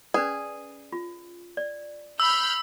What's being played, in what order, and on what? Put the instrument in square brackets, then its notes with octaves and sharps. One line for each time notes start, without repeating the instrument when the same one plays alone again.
[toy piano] C#4 B4 D5 [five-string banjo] G#4
[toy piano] F4
D5
[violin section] B5 F6 G6 [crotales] E6